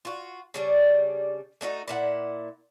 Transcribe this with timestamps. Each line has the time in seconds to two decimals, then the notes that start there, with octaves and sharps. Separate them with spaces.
0.05 F4 F#4
0.54 C#3 G3 D4
1.61 A3 D4 D#4 F#4
1.88 A#2 E4 F#5